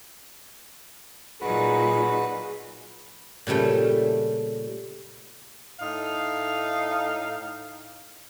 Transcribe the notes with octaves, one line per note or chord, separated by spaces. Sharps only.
A#2 F#3 D#4 F#4 G#4 B4
A#2 C#3 G3 A3 G5
A2 D#4 F5